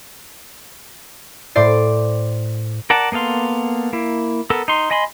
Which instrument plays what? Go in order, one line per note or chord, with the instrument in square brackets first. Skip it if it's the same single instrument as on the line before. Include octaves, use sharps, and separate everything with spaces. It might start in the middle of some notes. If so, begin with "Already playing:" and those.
[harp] A2 C5 D5 C7
[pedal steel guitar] A#4 D5 F#5 A5
A#3 B3 A4 F5 C6
A#3 E4
B3 A4 A#4
D#4 C6
D#5 G#5 B5 C6